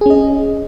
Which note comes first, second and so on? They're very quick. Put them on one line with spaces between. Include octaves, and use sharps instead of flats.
G#4 C#4 D#5